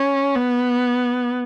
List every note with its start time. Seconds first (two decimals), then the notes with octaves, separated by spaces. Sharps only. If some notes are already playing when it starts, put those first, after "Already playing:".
Already playing: C#4
0.35 B3